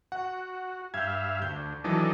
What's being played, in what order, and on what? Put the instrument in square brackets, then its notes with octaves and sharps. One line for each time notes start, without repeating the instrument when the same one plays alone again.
[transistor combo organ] F#4 [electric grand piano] F#5
[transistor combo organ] G2 E5 F5 [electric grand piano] G6 G#6
[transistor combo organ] D2 [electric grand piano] G6
[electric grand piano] D#3 E3 F#3 [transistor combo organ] D4 A4 D#5